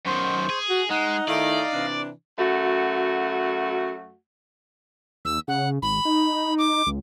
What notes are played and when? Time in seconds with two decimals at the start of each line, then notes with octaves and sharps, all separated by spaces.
0.06 F#2 D#3 C5 C#6
0.50 G#4
0.69 F#4
0.90 G#3 D#4 F#5
1.28 D#3 A3 E4 D5 D#5 F5 D#6
1.74 C3 E3 D4
2.38 F#2 A3 F#4
5.25 D#2 E6
5.48 C#3 F#5
5.82 G#1 B5
6.05 D#4
6.58 D6
6.87 C#2